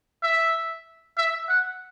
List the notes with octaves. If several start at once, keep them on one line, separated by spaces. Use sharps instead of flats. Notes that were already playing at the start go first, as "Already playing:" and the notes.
E5
E5
F#5